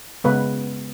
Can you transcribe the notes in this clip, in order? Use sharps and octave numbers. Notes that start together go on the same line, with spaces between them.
C#3 G#3 B3 B4